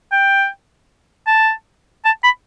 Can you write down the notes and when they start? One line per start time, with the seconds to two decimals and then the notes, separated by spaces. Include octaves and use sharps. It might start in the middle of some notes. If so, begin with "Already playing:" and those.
0.12 G5
1.27 A5
2.05 A5
2.24 B5